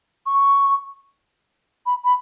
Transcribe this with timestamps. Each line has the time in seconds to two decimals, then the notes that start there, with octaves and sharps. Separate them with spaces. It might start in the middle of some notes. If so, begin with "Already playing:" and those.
0.26 C#6
1.86 B5
2.04 B5